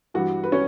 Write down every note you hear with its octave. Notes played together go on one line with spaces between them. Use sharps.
G2 E3 G3 F#4
B4
C#4 C#5